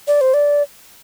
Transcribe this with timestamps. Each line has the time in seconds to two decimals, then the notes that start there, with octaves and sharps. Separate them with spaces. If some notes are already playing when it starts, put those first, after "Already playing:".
0.07 D5
0.21 C5
0.34 D5